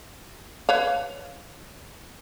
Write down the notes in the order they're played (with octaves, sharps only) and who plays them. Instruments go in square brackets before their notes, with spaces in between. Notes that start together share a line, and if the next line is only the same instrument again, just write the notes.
[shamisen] B4 C#5 F5